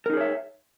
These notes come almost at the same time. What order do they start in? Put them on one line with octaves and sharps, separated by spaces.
A#4 D#4 G#4 C#5 E5